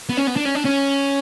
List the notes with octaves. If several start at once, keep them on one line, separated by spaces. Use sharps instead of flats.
B3
C#4
B3
D4
C#4
D4
C#4